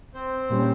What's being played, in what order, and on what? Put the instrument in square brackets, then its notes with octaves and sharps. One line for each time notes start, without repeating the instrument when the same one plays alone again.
[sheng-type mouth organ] C4 C5
[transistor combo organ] A#2 G3 C#4